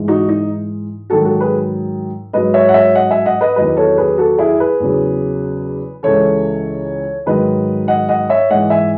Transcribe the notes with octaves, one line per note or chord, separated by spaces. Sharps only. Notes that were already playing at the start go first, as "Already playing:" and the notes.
Already playing: G#2 E3
D#4 F#4
D#4
G#2 D#3 F#3 F#4 A4
F#4 A4
G#4 B4
G#2 F#3 B4 D#5
C#5 E5
F#5
C#5 E5
D#5 F#5
E5 G#5
D#5 F#5
B4 D#5
E2 D#3 F#3 B4 D#5
A4 C#5
G#4 B4
F#4 A4
E4 G#4
G#4 B4
E2 C#3 F#3
C#2 C#3 E3 A4 C#5
G#2 D#3 F#3 B4 D#5
D#5 F#5
D#5 F#5
C#5 E5
G#2 E3 D#5 F#5
E5 G#5